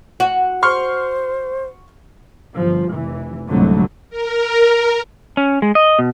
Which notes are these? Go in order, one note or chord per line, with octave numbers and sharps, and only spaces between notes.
F#4
C5 C6 C#6 F6
G1 F3
F1 E3
C2 F2 G#2 D3 F#3 A3
A#4
C#4
G#3
D#5
B2